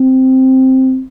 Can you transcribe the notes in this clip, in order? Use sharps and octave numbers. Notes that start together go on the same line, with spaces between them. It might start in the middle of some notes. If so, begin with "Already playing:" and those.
Already playing: C4